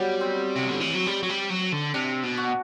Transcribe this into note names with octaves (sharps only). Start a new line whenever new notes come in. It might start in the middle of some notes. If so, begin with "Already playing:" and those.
Already playing: F#3 G3 B3
C4
C3
D3
E3
F#3
G3
F#3
G3
F#3
D3
C3 D4
B2
F#4